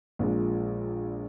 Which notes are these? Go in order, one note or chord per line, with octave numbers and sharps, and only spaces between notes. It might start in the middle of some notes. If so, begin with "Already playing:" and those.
A#1 A#2 G#3